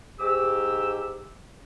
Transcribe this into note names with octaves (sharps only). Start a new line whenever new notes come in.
G#2 G4 E6